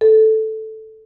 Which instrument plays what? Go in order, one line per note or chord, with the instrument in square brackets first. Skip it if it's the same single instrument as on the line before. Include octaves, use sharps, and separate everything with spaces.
[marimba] A4